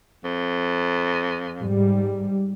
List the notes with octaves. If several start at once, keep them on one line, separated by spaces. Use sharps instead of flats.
F2
G#2 G3